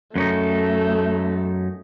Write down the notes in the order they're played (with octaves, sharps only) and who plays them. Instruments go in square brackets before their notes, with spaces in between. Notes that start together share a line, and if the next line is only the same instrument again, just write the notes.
[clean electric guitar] F#2 C#4 D#4 [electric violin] A3